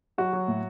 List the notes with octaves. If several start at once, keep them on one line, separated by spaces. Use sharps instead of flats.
F#3 F#4
F#3
A2